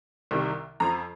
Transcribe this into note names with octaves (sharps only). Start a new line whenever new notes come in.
C2 C3 D#3 G3
F2 F3 A#5